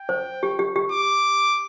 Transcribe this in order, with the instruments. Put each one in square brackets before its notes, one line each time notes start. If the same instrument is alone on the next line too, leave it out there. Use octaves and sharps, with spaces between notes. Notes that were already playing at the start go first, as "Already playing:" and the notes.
Already playing: [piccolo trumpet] G5
[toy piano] C5
G4
G4
G4
[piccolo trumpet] D6